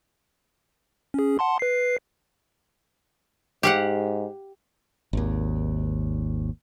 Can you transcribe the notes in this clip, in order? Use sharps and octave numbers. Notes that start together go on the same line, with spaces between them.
C#4 G#4
F#5 A5 C6
B4 C7
G#2 G4 F5 F#5
G#1 D#2